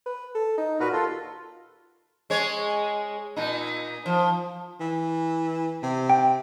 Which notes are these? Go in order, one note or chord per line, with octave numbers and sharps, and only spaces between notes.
B4
A4
D#4
A#2 F#4 A#4 B4
D#2 F4 A4
G#3 C#5
A#2 D#4
F3
E3
C3
G5